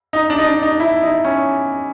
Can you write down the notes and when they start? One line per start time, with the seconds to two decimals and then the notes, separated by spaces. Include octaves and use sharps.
0.13 D#4
0.30 D4
0.39 D#4
0.46 D4
0.63 D#4
0.80 E4
1.02 D#4
1.25 C#4